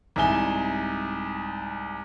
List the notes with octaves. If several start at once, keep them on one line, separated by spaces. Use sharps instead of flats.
C2 G#2 E5 G#5 G7